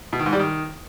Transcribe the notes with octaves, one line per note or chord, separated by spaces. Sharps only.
B2
D#3
G#2
G3
D#3